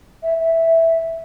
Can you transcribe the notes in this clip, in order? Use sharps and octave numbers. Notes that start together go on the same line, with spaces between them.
E5
E5